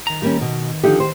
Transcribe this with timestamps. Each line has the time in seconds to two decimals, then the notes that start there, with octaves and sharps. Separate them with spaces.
0.07 D#3 A#5
0.22 G3 A#3 C#4
0.41 B2
0.84 D3 F3 D#4 G4
1.00 C5